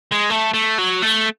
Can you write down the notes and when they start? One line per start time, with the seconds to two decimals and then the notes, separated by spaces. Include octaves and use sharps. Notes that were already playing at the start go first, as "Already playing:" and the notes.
0.12 G#3
0.30 A3
0.54 A3
0.79 F#3
1.03 A3